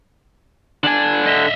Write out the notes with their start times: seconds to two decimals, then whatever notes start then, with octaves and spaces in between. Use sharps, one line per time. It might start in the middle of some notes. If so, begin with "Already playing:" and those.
0.84 D3 D4 G#5
1.26 D#5 E5